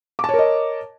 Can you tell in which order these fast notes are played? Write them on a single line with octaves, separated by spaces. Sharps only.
D6 A5 C#5 A#4 D#5